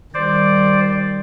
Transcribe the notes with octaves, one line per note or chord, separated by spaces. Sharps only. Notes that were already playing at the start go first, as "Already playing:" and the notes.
D#3 G3 C5 D5